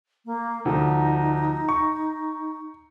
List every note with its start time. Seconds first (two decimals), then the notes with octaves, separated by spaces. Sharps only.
0.25 A#3
0.65 D2 F3 D#4
1.69 C#6